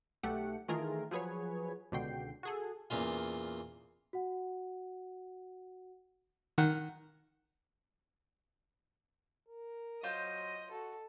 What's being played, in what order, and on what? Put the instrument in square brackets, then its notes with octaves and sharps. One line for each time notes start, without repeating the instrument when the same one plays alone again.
[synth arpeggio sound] B1 A3 G4 F#5 C#7
D#3 E3 A3 F4 G#4 A#4
F3 F#3 G#4 B4 C#5
C#2 B2 D3 F#4 G5 C7
F#4 G#4 A4
[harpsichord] E2 A#2 C#4 F4
[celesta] F#4 F#5
[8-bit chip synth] D#3 F#5
[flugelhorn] A#4
[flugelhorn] F#3 [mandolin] F4 C5 [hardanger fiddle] D#5
[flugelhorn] F#4 [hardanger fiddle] A4